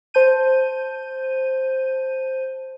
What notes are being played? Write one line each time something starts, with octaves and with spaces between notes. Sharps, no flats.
C5 A5 G6 D#7